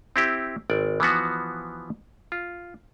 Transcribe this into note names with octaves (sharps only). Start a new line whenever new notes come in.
C4 E4 G4
G#1 D5
E3 F3 B3 F#4
F4